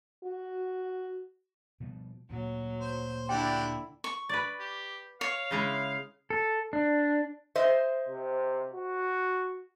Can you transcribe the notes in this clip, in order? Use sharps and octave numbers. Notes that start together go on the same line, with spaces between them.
F#4
B2 F3 G3
D2 A#2 F#3
C5
D3 D4 E4 F#4 G4 G5
C#6
B4 D5
G4
C#5 F5
C#3 G#3 E4
A4
D4
C5 D#5 E5
C3
F#4